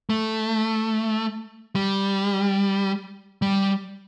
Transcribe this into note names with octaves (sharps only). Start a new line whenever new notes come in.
A3
G3
G3